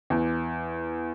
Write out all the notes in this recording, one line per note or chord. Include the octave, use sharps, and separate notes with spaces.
E2